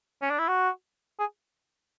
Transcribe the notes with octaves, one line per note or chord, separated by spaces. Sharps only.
C#4
D4
E4
F#4
G#4